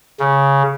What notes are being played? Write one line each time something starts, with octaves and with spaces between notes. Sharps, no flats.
C#3